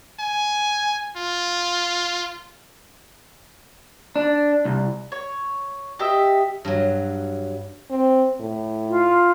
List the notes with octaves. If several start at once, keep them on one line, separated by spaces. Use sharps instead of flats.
G#5
F4
D4
C2
C#5
G4 D#5 E5
G2 F#3
C4
A2
F4